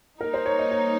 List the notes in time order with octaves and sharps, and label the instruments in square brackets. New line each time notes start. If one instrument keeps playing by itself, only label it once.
[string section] G3 A#3 D#4 [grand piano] A#4
[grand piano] C5
C#5
D#5
C#5